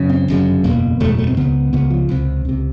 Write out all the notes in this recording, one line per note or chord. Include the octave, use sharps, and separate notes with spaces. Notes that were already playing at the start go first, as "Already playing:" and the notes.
Already playing: F#2 C#3
C4
G1 F#2 C#3
F#1 E2 B2 A#3
F#1 E2 B2 A3
G#3
A3
C4
C#2 C#3 B3
C#2 C#3 B3
F3
C#2 C3
C#2 C3